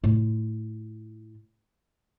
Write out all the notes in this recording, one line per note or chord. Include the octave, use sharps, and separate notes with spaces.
A2 F4